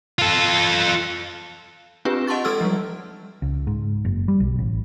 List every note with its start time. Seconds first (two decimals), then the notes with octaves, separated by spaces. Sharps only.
0.19 F4 A4
2.05 C4 D4 F4 G4 G#4 B4
2.27 D#5 F#5 A5 C6 C#6 A6
2.44 G#3 A4 C6 E6 F6
2.61 F3 G3
3.42 C#2
3.67 G#2
4.05 F#1
4.28 G3
4.40 B1
4.59 A1